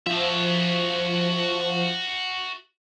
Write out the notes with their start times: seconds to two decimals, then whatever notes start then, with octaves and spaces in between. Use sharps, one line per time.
0.06 F3 F#4 E5